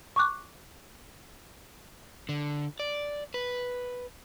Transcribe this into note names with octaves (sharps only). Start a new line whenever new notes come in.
C#6 D6 F#6
D3
D5
B4